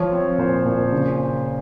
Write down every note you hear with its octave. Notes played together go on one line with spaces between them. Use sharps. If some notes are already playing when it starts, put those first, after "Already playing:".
Already playing: F3 C#5
C4
A#2 C5
A#2
C#3